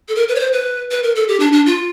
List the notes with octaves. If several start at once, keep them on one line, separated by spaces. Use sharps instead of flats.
A4
A#4
B4
C#5
C5
B4
B4
A#4
A4
G4
D4
D4
F4